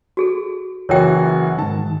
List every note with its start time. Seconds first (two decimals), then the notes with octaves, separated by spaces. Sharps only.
0.17 F#4 G#4 A4
0.89 F#1 E3 F#4 C#5 G5
1.59 G#2 D#3 A5